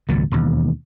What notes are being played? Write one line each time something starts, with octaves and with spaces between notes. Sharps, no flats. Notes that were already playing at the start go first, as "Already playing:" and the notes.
G#1 C#2 A#2 F#3
E1 D#2